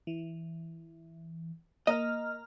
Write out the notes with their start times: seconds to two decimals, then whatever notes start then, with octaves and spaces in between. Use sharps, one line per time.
0.07 E3
1.87 A#3 D#5 A#5 F6